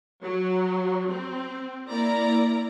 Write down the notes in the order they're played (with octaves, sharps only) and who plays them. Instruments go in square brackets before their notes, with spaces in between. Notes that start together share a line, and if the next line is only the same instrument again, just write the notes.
[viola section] F#3
C4
A#3 E4 D5 A#5